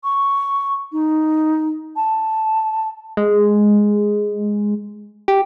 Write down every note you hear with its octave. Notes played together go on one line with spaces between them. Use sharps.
C#6
D#4
A5
G#3
G4